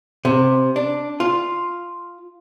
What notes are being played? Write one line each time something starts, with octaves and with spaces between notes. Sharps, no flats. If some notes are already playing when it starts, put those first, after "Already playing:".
C3
D4
F4